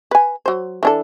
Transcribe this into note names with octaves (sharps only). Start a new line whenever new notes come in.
B4 G#5
F#3 C5
E3 D4 A4